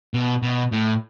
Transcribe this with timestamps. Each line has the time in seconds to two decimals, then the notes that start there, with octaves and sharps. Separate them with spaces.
0.14 B2
0.42 B2
0.72 A2